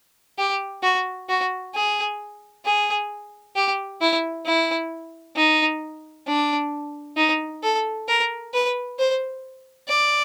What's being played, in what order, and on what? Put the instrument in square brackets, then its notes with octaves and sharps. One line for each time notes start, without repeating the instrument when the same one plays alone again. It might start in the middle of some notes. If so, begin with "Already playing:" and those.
[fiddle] G4
F#4
F#4
G#4
G#4
G4
E4
E4
D#4
D4
D#4
A4
A#4
B4
C5
D5